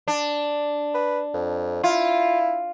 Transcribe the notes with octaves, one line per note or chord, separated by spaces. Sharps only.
D4
B4
F2
E4 F4